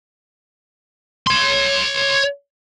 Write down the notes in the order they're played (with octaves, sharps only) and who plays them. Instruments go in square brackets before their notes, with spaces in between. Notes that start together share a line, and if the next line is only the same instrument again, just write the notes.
[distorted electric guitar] C#5 C6